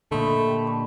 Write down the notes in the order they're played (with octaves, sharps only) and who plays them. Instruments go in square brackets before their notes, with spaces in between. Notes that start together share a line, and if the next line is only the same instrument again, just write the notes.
[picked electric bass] A#2 D3 [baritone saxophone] A3 [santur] C5 D#5 B5
[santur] G4
D4 C#6